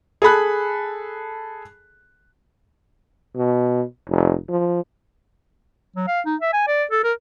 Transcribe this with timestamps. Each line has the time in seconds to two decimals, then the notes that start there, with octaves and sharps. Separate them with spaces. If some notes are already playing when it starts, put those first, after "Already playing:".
0.22 G#4 A4 B5 F#6
3.37 B2
4.09 F1
4.49 F3
5.96 F#3
6.07 F5
6.25 D#4
6.40 E5
6.53 G#5
6.67 D5
6.91 A4
7.04 A#4